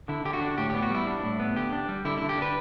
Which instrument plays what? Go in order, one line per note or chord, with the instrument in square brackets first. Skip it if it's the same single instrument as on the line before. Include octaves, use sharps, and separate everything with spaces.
[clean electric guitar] D3 E4
D3 G4
F#4
D4
A2 G4
B3 G4
F#4
G3 E4
D4
A2
B3
D3 G4
D4
G3
D3 E4
D3 E4
G4
D4 B4